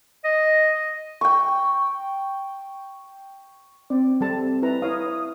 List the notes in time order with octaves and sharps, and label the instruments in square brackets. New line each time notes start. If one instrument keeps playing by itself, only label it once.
[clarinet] D#5
[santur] G5 C#6
[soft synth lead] C4 [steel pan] D5
[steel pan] G3 A4 A5
E4 B4 A#5
[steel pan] E4 C#5 F5 [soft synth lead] D#6